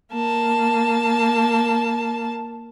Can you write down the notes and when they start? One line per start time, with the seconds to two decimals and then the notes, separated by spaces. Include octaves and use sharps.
0.13 A#3 A5